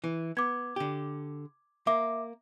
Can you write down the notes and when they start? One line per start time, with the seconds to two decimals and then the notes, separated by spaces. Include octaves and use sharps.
0.04 E3
0.37 B3 D6 G#6
0.76 D3 G4
1.87 A#3 E5 D6